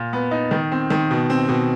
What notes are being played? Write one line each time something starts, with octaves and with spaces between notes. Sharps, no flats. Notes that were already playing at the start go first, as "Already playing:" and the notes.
Already playing: A#2
B3
D#4
D#3
C4
D#3
B2
C4
B2